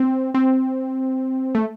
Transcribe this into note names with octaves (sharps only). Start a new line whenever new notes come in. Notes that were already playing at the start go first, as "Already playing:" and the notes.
Already playing: C4
C4
A3